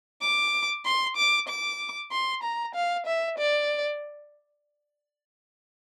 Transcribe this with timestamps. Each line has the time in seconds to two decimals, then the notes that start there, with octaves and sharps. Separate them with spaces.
0.21 D6
0.85 C6
1.17 D6
1.48 D6
2.12 C6
2.43 A#5
2.75 F5
3.06 E5
3.38 D5